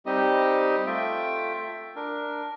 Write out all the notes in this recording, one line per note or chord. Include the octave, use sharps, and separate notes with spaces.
G3 C4 D#4 G4 D#5
A3 F4 E5 G5
D4 A#4